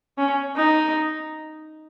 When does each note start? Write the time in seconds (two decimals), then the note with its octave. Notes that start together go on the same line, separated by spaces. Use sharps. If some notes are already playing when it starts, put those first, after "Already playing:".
0.18 C#4
0.56 D#4